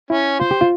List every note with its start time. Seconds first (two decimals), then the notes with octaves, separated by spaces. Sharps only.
0.10 C#4 E4
0.40 F4 C5
0.51 G4
0.61 F4